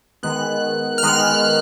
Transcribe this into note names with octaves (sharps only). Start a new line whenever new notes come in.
D#3 G#3 B3 F#6
F6
D#3 G#3 B3 F#6